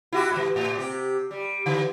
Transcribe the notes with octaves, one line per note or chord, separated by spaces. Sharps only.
E4 F#4 G4
G#2 E3
A2
C3 G4
G3
D3 E3